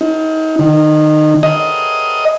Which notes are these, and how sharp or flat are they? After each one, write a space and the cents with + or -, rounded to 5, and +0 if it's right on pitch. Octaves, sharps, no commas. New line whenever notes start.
D#4 +30
D#3 -25
D#5 +10